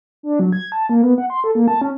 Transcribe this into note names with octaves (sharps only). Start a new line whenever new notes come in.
D4
F#3
G#6
A5
A#3
B3
F#5
C6
A4
A#3
A5
C#4